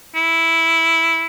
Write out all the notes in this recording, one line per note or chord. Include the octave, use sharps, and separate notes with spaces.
E4